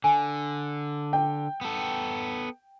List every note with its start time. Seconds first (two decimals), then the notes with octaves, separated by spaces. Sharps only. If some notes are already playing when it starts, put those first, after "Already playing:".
0.04 D3 G#5
1.13 G5
1.61 B3 A4